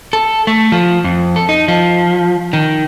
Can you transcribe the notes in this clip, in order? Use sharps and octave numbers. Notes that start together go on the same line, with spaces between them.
A4
A3
F3
F2
A4
D#4
F3
D#3